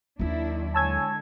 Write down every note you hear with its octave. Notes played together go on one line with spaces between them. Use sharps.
D#2 D#3 F#3 D4 E4
D3 G#3 C#5 G#5 A5 E6 G#6